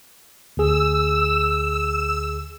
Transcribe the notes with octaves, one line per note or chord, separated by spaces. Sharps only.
D2 G#4 E6